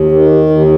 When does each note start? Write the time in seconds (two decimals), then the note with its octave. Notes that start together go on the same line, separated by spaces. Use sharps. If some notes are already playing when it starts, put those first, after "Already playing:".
Already playing: D#2
0.12 D#3
0.50 D#2